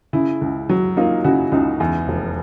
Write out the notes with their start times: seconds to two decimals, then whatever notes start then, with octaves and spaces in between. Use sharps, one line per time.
0.13 C#3 E4
0.41 C#2
0.69 F#3
0.97 A#3 D#4 F4
1.24 C#3 E4 F#4
1.52 C#2 D#4 F4
1.80 E2
2.08 F1